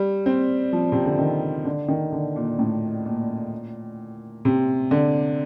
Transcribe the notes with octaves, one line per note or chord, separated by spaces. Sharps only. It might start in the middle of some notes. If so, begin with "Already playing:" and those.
Already playing: G3
C4
F3
C3
D3
D#3
D3
D#3
D3
A#2
A2
A#2
C3
D3